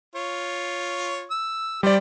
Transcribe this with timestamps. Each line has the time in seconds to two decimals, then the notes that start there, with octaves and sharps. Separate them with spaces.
0.15 F4 C#5
1.31 E6
1.83 G3 G4 C5 D5